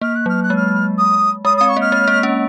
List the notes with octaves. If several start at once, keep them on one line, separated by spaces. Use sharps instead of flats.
A#3 F6
F#6
F#3 F6
F#6
G#3
F6
D#6
G#3 D#6
D#6
C4
C#6
A#3 F6
G#3
A#3
C#4